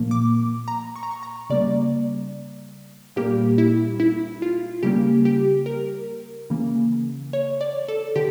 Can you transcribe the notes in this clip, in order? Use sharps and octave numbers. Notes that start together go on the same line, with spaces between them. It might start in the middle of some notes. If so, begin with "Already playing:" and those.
Already playing: A#2 F3 A#3
D6
A#5
C#6
A#5
C#6
A#5
C#3 G3 A#3 D5
A#2 G3 A#3 G4
E4
E4
F4
C#3 G3 A#3 G4
G4
A#4
C#3 E3 A#3
C#5
D5
A4
D3 G4